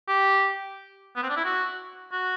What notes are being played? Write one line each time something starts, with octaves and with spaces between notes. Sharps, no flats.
G4
B3
C4
D4
E4
F#4
F#4